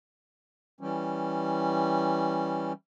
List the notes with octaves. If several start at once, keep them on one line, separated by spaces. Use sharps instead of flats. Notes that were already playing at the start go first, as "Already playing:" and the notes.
E3 G3 C#4